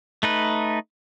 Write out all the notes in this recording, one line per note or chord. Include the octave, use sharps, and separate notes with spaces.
A3 D#4 B4